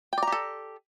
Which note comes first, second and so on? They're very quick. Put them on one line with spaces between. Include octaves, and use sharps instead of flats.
G5 D5 A#5 G4 A4